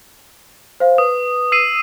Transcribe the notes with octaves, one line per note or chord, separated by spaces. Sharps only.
C5 F5
B4 D#6
E6 C7 D#7